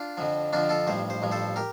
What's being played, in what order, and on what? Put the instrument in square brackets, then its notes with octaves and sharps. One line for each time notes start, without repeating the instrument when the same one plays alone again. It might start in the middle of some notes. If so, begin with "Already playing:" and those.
Already playing: [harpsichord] D4 F4
F2 D3 F3
F2 D3 F3 D4 F4
F4 A4
A1 G2 F3 C5
C5
A1 G2 F3
A4 C5
G4 A#4